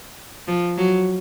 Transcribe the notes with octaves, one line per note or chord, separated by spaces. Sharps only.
F3
F#3